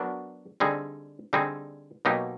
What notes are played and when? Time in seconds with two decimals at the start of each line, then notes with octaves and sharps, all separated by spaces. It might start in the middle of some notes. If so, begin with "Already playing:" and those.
Already playing: F#3 B3 D4 F#4 A#4
0.60 D3 G3 C4 D#4 G#4
1.33 D3 G3 C4 D#4 G#4
2.05 B2 F#3 A#3 D#4 G4